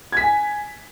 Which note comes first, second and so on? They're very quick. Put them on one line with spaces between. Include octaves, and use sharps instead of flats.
G#6 B6 G#5